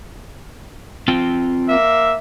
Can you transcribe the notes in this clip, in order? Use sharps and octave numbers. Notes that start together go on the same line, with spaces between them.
C4 F4 G5
A#3 E5